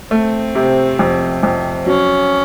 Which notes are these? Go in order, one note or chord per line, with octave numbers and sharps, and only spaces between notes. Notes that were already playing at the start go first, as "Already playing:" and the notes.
A3 C4
C3
F2
F2
F#3 C#4